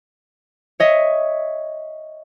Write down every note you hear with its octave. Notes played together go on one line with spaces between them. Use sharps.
C#5 D#5 E5